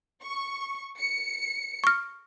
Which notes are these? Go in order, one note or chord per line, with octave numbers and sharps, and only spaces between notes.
C#6
C#7
C#6 F6